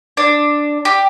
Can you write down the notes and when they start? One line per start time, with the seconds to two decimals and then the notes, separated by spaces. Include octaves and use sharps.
0.17 D4
0.85 G4